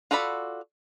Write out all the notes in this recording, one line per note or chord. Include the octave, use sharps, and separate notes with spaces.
F4 F#4 A4 D5 B5